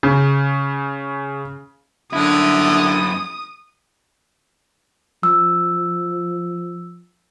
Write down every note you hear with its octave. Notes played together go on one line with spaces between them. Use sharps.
C#3
F#2 D3 E4 D#6
F3 E6